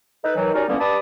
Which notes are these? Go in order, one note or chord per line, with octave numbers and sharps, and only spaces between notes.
D#4 A4 B4
D#3 E3 F#3
G3 C#4 D#4 F#4 A#4 D5
D3 E3 G3 A#3 B3 C#4
G2 G3 A5 B5 D6 D#6